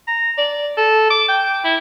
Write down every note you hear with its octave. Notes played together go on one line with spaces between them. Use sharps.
A#5
D5
A4
D6
G5
E4